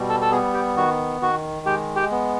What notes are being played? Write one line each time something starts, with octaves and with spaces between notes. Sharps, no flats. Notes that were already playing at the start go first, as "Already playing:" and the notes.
Already playing: B2 G3
A4
A4
B3 G#4
G4
D#3 F#4
D#3 F#4
G#3 G4
G4
B3